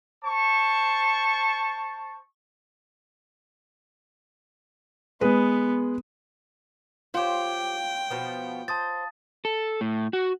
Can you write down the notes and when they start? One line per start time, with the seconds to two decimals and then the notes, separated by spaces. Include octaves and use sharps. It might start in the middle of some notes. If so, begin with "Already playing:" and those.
0.24 C5 A5 C#6
5.21 G#3 B3 B4
7.14 F4 G4 C5 C#5 G5
8.10 B2 F3 B3
8.68 C5 A5 D#6 A6
9.45 A4
9.81 A2
10.13 F#4